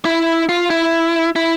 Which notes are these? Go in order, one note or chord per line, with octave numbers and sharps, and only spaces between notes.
E4
F4
E4
E4